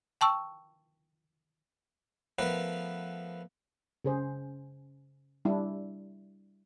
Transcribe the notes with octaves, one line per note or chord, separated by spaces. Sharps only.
G5 A5 C#6 E6
F3 A3 B3 A#4 B4
C#3 G#4 C5
G3 D4 E4